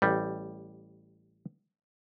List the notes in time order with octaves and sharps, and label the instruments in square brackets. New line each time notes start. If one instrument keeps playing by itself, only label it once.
[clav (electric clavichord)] A1 G3